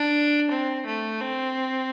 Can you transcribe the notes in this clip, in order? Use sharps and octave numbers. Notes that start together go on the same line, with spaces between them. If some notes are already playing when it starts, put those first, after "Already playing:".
Already playing: D4
C4
A3
C4